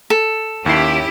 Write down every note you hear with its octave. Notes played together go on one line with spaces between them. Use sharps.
A4
D#2 C#4 E4 G4 C7